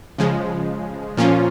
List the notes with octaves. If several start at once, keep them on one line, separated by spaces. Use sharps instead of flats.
C#3 F3 G#3
A#2 F3 A#3 C#4 F4